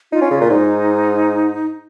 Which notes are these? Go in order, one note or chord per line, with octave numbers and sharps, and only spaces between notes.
D#4 F4
C#4
C#3
A#2
G#2 D#4